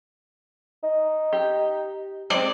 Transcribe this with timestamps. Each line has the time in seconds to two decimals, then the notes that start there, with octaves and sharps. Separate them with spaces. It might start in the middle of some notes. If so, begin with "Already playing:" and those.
0.84 D#4
1.33 G4
2.30 G#3 C4 D5